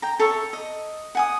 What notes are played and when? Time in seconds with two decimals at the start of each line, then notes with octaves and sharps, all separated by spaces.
0.02 G5 A#5
0.19 A4 C#5 E5
0.53 D#5
1.15 F#5 G#5 D#6